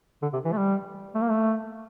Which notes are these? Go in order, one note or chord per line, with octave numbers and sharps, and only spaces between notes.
D3
C3
E3
A3
G3
A3
A#3
A3